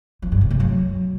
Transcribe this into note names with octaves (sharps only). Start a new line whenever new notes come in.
F3
G2
C3
A3
F#3